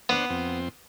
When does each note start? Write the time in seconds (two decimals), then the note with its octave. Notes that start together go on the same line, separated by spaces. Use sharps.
0.09 B3 D4 C5 F#5
0.30 F2 C4